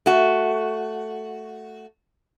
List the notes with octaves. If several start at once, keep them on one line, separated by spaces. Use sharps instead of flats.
A3 F#4